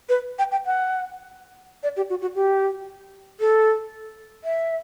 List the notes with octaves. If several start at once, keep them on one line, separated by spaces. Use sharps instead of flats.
B4
G5
G5
F#5
D5
G4
F#4
F#4
G4
A4
E5